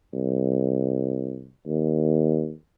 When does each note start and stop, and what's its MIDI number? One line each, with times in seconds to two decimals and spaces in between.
0.13 1.50 36
1.66 2.53 39